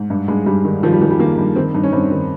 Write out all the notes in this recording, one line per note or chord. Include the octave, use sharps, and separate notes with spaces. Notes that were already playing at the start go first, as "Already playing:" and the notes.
Already playing: G#2
G2
G2 G#3
G2 G3
D#3
D#3 F3
G3
D#3 G#3
G3
D#3 A#3
G2
D#3 C4
G2 D#4
C#4
G2 C4
D#3